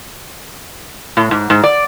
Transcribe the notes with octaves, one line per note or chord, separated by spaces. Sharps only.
A2
G#2
G#2
D5